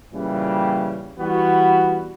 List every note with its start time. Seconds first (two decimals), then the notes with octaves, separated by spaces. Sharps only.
0.12 A#2 C#3 E3 G3
1.18 E3 G3 B3 F#4